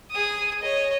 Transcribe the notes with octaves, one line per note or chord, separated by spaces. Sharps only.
G#4 D#6
C#5 D#5